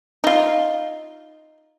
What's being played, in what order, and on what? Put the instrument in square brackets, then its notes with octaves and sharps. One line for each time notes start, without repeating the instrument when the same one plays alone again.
[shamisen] D#4 F4